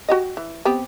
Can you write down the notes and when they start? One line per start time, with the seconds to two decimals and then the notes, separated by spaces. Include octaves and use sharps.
0.08 F#4 G4 D#5
0.37 E3
0.65 B3 C4 G4